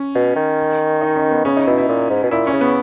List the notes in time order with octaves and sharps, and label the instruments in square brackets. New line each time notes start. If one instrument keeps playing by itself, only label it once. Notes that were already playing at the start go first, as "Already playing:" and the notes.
Already playing: [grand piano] C#4
[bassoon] B2
D#3
[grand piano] D#4
C#4
B3
[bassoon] C#3 [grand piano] C#4
[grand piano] D#4
[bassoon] B2 [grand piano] E4
[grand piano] E4
[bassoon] A#2
G#2
B2
[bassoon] A#2 [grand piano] E4
[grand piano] C#4
[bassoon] C#3
[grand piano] B3